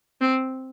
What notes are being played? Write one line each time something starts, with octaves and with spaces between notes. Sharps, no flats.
C4